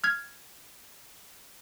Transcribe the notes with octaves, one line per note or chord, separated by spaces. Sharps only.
F6 G#6